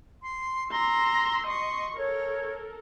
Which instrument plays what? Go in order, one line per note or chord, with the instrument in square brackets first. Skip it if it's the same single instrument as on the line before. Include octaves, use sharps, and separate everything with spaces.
[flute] C6
[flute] A#5 [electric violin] C6 E6
[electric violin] D#5 C#6 [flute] C6
[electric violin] A4 A#4 [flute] C#5